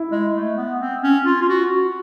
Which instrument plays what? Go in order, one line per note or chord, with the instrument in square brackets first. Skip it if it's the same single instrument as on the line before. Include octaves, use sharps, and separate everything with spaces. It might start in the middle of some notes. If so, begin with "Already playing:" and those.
Already playing: [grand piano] E4
[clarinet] G#3
A3
B3
C4
C#4
F4
F4
F#4